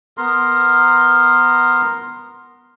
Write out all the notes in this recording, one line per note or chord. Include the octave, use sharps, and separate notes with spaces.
B3 A#4 C6